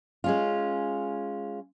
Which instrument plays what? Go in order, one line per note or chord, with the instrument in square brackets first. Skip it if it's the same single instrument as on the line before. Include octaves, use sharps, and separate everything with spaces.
[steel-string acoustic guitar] G#3 C#4 F4